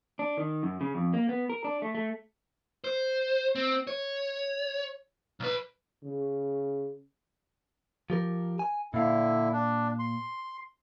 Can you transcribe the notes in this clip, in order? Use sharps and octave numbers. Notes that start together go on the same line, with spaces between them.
D4
D#3
F#2
C#3
F2
A#3
B3
A#4
D4
A3
A3
C5
C4
C#5
B1 B4
C#3
F3 G4 A#4
G#5
A#2 D3 E4 F5
D4
C6